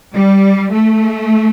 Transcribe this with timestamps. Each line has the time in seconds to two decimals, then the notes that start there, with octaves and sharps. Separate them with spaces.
0.13 G3
0.73 A3